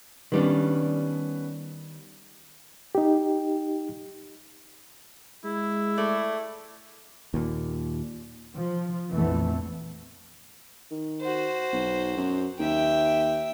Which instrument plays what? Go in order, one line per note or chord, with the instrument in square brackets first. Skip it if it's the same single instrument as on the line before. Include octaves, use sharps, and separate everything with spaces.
[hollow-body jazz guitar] D#3 G3 D4 [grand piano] B3 C#4 B4
[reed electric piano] D#4 G4
[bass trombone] G#3 [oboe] E4
[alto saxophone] A3 [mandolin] D5
[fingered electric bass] D#2 A#2
[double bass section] F3
A#1 F2 E3 A3 B3
[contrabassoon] D#3
[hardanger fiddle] F#4 C5
[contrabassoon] B1
F#2
[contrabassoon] D#2 [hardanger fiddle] E5 G5